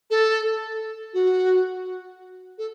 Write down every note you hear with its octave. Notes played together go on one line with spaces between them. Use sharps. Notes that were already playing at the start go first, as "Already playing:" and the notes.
A4
F#4
A4